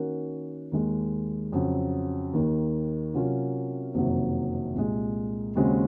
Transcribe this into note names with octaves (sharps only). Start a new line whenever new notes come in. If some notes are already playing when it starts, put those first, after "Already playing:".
Already playing: D#3 A#3 C#4 F#4 A#4
D#2 D#3 G#3
F2 C#3 F#3
D#2 D#3 A#3
C3 F#3 A#3 C#4 F4
F#1 F2 C3 D#3 F#3
C2 A#2 G#3
D#2 C#3 G#3 C4 F#4